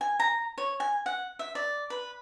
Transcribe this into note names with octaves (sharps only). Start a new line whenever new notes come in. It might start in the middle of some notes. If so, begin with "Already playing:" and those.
G#5
A#5
C#5
G#5
F#5
E5
D5
B4